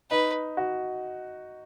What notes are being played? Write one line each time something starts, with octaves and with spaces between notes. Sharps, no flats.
D#4 B4
F#4